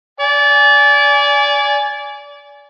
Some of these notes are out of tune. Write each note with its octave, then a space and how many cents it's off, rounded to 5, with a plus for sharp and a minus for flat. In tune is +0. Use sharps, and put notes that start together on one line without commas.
D5 -25 G#5 +0